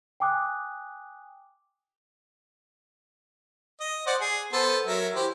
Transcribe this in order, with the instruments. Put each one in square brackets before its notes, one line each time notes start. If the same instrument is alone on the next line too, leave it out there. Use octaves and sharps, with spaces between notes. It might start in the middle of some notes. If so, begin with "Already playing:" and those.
[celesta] G5 G#5 D6 D#6 F#6
[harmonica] D#5
C5 D5 F#5
G#4
B3 A4 C5
F#3 A#4 E5
E3 G4 C5